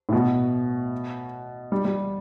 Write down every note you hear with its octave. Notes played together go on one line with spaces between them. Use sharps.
A2
B2
G3
G3